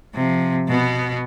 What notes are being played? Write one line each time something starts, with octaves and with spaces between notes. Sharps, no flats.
C3 F3
B2 B3